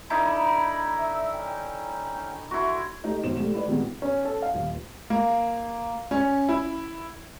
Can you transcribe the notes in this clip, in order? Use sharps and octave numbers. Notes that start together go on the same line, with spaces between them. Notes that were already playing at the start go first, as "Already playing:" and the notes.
D3 D#4 E4 B5
E5
C#4 G5
E4 F#4 C6
A3 D#4 G4
G#1 D#2 B2 C5 E7
G3 A3 E7
E4 B4 D5
A#2 D#3 G3 G#3 B3 C4
C#4
A4
F5
D#1
A#3
C#4
E4